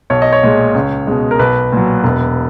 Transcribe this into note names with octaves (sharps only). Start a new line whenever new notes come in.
B1 C#5
D#5
C#5
A#2 G#3
C#2
B2 G#3
A#4
B1 B4
A#2 F#3
E1